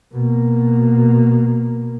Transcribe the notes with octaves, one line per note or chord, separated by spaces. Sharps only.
B2 A#3